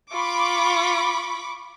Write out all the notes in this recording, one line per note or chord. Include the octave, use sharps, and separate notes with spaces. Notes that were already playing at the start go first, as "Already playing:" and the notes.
F4 B5 C#6 D6